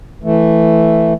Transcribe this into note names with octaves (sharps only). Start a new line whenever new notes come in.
E3 A3